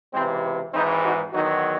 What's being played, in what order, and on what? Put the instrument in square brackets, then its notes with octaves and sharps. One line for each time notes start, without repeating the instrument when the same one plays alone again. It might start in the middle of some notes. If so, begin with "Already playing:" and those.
[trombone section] C#2 C3 E3 G#3 C4
G#1 G#2 E3 C4 D#4
D#4 F#4
E2 D#3 F#3 D#4 F#4